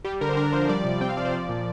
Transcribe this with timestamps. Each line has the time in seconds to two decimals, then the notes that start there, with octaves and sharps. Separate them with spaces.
0.05 G3 G4
0.21 D3 A#4
0.29 C5
0.37 D4 A#4
0.53 F3 C5
0.69 G3 D5
0.85 C3
1.01 C4 G5
1.09 F5
1.17 F3 D5
1.25 C5
1.33 F3 D5
1.49 A#2